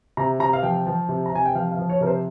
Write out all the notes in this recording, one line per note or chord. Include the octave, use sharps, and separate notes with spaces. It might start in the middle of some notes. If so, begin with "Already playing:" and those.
C3 A#5
C3 A#5
F5
F3 G5
F3
C3
A#5
C3 G#5
G5
F3 F5
F5
F3
C#5
C3 A#4
C5